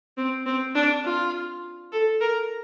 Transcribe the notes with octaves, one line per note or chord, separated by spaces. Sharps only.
C4
C4
D4
F4
A4
A#4